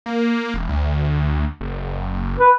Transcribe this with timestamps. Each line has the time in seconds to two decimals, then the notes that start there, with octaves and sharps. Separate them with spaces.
0.06 A#3
0.54 E1
0.68 D2
1.61 F#1
2.40 B4